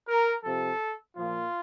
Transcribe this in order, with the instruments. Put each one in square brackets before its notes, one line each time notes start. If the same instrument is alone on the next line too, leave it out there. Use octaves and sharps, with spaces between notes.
[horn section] A#4
C3 F3 A4
A#2 F3 F4